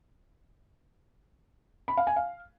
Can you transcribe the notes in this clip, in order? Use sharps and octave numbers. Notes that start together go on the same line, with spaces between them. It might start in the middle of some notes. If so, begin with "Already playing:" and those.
B5
F5
G#5
F5